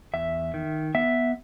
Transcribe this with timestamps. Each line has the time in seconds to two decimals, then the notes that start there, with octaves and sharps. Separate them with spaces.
0.14 E2 E5
0.54 D#3
0.95 B3 E5